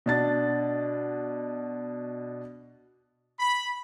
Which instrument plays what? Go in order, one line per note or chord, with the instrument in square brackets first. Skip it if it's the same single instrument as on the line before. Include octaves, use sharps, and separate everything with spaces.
[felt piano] B2 D4 A6
[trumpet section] B5